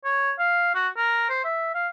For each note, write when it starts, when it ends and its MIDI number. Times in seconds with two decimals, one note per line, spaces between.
0.05 0.32 73
0.39 0.73 77
0.74 0.88 66
0.97 1.29 70
1.29 1.40 72
1.45 1.72 76
1.74 1.88 77